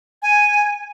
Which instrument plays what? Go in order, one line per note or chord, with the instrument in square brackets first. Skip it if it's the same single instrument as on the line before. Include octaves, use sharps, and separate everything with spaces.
[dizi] G#5